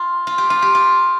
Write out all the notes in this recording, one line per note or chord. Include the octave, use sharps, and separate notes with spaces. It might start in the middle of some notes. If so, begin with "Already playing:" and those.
Already playing: F4
F4
G4
F4
G4
F4